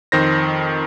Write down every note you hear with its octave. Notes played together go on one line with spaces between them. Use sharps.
F2 D#3 C5 A#6